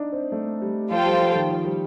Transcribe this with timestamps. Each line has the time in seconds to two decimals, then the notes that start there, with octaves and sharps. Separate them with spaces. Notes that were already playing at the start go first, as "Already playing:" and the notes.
Already playing: D4 D#4
0.12 C4
0.32 A3
0.62 G3
0.91 F3 F4 A4 C5 G5
1.06 G3
1.21 F3
1.35 D#3
1.50 F3
1.65 G3